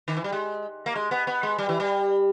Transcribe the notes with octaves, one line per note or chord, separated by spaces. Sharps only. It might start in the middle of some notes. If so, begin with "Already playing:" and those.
D#3
E3
G3
G#3
A#3
G#3
B3
B3
G#3
G3
E3
G3